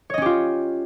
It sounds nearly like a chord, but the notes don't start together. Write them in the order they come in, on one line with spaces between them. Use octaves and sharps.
C#5 D#5 C#4 G4 F4